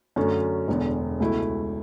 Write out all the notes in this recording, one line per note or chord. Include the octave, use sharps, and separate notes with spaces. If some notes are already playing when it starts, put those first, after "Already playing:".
F#2 D3 F#3 A3 C#4
E1 E2 D3
C#2 B2 A3 E4